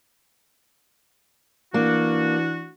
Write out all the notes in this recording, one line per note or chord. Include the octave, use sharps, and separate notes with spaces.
E3 A#3 D4 F#4